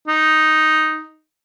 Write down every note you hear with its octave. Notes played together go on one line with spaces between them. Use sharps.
D#4